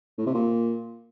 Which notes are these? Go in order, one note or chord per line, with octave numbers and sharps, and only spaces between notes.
A2
C3
A#2